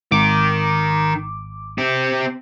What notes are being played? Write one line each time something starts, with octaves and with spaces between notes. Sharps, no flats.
G#1 D#3 D6
C4 G4